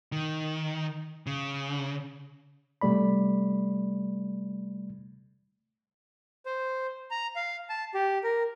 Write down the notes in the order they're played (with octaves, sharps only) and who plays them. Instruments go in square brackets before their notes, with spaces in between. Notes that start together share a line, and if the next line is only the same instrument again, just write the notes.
[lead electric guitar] D#3
C#3
[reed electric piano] C3 G3 A3 D5 B5
[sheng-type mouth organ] C5
A#5
F5
A5
G4
A#4